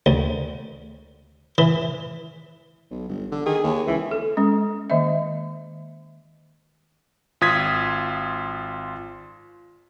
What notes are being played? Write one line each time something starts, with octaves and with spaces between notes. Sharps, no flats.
D2
E3
B1
G1
D3
D#3 G#4
D#2
C#2 E3
A4
G#3 C#4
D#3 A#3 D#5 E5
G#1 F4 D#6 G#6 B6